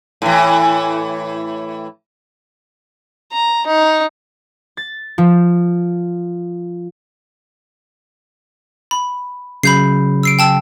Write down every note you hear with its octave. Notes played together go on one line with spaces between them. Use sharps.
A2 E3
A#5
D#4
A6
F3
B5
C#3 F#3 B5 G6 C7
E6 C7 D7
G5 A5 E6